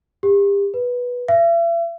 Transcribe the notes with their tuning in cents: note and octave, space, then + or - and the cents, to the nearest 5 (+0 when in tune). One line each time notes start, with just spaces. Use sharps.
G4 +35
B4 -10
E5 +40